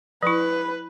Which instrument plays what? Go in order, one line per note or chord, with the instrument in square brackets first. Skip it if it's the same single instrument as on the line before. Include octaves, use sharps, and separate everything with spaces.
[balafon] F3 E4 [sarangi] B4